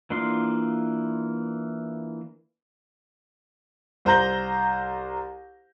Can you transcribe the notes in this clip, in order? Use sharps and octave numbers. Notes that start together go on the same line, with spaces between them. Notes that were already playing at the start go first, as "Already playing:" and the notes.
E3 A#3 D4 F4 C6
C2 C5 A#5 G6 A#6 G7